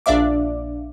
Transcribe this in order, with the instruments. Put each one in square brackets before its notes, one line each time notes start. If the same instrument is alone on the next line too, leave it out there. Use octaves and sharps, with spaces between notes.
[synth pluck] A#1 D4 D5 E5 F5 D6